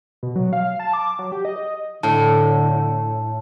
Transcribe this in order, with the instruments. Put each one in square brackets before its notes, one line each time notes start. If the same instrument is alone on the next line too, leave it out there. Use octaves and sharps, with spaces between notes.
[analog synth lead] B2
F#3
F5
A5
D6
F#3
G4
D#5
[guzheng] A2 [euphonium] D3 [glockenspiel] A5